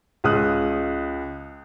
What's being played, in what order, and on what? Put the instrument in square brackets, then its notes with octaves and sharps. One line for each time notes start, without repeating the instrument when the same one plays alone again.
[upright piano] C#2 D#6 F#6